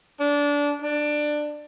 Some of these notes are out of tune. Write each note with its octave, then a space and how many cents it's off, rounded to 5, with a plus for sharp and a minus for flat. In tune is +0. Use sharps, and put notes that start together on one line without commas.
D4 -20
D4 +15